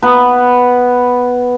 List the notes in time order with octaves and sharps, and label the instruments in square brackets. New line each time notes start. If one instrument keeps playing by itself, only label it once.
[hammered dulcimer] B3 B4